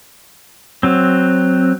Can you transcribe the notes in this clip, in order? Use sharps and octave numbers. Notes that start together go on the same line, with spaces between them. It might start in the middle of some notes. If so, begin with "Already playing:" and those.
F#3 C4